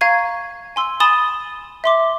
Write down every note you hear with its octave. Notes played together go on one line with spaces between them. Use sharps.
F5 A#5 C#6 G#6 D#7
G#5 C6 E6
G#5 B5 D#6 A6 E7 G7
E5 C6 D6